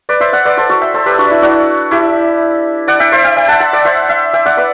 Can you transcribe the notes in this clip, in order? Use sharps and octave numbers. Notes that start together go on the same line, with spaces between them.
B4 D5
C5 E5
D5 F#5
B4 D5
A4 C5
F#4 A4
E5 G5
A4 C5
G4 B4
D4 F#4
E4
D4 F#4
E4 G4
D5 F#5
E5 G5
C5 E5
E5 G5
E5 G5
F#5 A5
F#5 A5
D5 F#5
C5 E5
E5 G5
E5 G5
D5 F#5
B4 D5